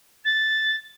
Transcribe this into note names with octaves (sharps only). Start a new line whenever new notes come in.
A6